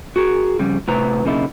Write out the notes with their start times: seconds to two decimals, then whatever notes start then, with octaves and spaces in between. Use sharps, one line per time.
0.16 F#4 G#4 A#4
0.59 F2 C#3 G3
0.88 A2 C3 B4 A#5
1.24 B1 C#3 A#3 D#4 E4